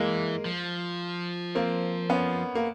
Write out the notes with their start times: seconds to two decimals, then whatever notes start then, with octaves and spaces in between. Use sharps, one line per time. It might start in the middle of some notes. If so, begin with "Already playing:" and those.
Already playing: E3 G#3 A#3
0.45 F3
1.55 A#3 C4
2.10 B3 C#4
2.55 A#3